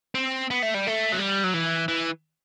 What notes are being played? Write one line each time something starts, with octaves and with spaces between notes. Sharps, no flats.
C4
B3
A3
G3
A3
F#3
G3
F#3
E3
E3